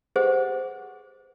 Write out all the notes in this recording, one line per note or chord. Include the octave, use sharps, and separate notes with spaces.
G4 G#4 B4 C5 D#5 F#5